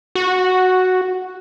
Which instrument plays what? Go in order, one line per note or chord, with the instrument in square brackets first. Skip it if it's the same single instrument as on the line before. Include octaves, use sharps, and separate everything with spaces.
[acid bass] F#4